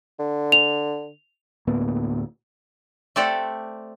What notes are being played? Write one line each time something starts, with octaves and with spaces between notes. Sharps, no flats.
D3
F7
D2 A2 A#3 B3
A3 C4 G4 A4 D5 F#5